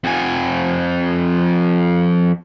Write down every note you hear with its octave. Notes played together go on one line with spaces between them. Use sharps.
F2 G#5